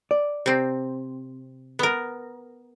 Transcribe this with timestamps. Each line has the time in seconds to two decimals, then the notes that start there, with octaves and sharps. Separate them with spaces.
0.11 D5
0.46 C3 C4
1.79 B3 A#4